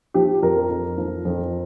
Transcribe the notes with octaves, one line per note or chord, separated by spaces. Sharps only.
F3 G4
F2 A#4
F2
F3
F2